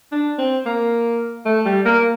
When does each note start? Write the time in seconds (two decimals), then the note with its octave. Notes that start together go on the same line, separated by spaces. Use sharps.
0.12 D4
0.38 C4
0.66 A#3
1.45 A3
1.66 G3
1.85 A#3